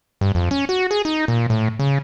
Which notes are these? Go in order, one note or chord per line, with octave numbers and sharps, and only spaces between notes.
G2
F2
C#4
F#4
G#4
D#4
A#2
A2
C#3